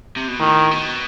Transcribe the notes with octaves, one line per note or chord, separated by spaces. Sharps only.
C3
B2
A2 D#3
B2